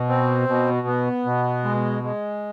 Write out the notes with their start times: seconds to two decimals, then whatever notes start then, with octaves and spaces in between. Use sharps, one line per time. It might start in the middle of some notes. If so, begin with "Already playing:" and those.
Already playing: B2
0.09 C4
0.48 B2
0.87 B3
1.26 B2
1.64 G#3
2.03 G#3